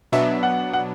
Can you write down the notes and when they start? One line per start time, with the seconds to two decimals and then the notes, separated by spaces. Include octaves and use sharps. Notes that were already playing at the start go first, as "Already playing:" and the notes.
0.12 B2 F#3 B3 D4 E5
0.43 F#5
0.73 F#5